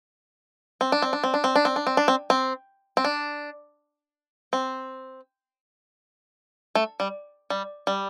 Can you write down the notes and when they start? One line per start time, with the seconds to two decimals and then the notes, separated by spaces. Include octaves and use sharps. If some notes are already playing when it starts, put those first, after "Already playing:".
0.81 C4
0.92 D4
1.02 C4
1.13 D4
1.24 C4
1.34 D4
1.44 C4
1.56 D4
1.65 C4
1.76 D4
1.87 C4
1.97 D4
2.08 C4
2.30 C4
2.97 C4
3.05 D4
4.53 C4
6.75 A3
7.00 G3
7.50 G3
7.87 G3